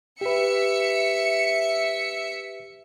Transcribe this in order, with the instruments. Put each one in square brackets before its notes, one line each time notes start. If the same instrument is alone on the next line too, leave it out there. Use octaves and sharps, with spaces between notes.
[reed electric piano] G4 B4 [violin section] E5 C#7